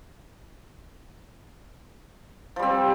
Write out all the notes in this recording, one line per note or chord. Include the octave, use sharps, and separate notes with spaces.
F3 G3 C4